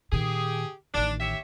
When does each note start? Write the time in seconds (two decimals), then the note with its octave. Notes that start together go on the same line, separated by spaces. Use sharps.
0.12 A#2 D#3 G4 G#4
0.94 A1 D#3 D4
1.20 G4 C#5 E5